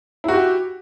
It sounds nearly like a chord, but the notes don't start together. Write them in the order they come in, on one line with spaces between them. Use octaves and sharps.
E4 F#4 G4